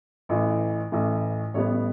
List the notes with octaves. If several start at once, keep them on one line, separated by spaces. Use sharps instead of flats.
A1 A2 E3
A1 A2 E3
A1 A2 G3 B3 C#5